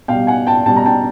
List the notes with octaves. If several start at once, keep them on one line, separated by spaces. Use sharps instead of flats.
B2 G3 F5 G5
F#5 G#5
G5 A5
B2 G3 G5 A5
A#5
G5 A5